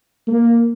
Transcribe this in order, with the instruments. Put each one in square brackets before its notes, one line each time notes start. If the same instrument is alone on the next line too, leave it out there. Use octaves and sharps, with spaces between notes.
[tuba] A#3